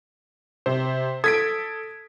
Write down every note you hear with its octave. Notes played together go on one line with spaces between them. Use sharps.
C3 C5
A4 D#6 G#6 B6 D7